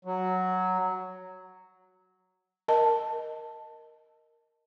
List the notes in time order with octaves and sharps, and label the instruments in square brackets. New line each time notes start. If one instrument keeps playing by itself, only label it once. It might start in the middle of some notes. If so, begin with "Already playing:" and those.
[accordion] F#3
[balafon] A#4 D#5 A5